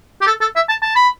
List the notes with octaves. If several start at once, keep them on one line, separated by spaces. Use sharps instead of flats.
G4
A4
A4
E5
A5
A5
B5